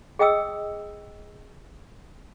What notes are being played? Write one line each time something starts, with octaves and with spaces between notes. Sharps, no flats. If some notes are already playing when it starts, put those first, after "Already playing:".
G#4 D#5 G5 D#6 E6